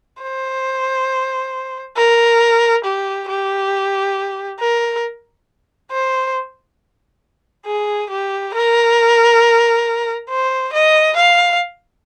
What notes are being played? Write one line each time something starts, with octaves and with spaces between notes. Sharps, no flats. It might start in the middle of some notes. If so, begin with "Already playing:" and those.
C5
A#4
G4
G4
A#4
C5
G#4
G4
A#4
C5
D#5
F5